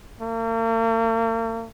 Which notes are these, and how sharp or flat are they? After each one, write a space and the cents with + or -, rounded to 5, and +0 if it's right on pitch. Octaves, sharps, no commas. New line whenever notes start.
A#3 -45